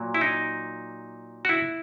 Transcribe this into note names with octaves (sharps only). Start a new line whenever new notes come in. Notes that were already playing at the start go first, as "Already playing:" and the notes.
Already playing: A#2 F#3 A#3
E4
D#4
F#4
E4